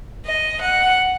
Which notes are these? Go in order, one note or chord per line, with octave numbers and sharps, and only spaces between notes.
D#5
F#5